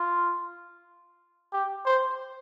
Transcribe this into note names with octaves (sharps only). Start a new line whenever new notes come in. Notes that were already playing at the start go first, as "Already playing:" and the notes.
Already playing: F4
G4
C5